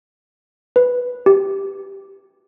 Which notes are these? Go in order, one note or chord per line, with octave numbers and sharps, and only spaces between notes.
B4
G4